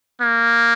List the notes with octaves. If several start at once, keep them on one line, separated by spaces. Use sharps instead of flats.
A#3